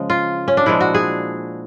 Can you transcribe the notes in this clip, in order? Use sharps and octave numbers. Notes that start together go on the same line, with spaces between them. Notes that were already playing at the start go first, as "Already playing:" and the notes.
Already playing: C#3 F3 G#3
F4
C#4
D4
A#2 F3 G#3 E4
F#4
G#4